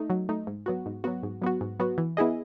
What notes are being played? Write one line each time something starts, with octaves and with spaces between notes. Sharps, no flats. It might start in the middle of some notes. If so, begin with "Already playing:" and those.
Already playing: A3 D#4
F#3
A3 D#4
G#2
F#3 B3 F#4
G#2
F#3 B3 F#4
G#2
F#3 B3 F#4
G#2
F#3 B3 F#4
E3
B3 E4 G#4 D#5